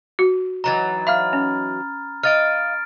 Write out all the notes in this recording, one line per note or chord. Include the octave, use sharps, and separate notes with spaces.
F#4
E3 F#3 D#4 A#5 A6
E5 F5 B5 F6
C#4
D#5 F5 F6 A6 D7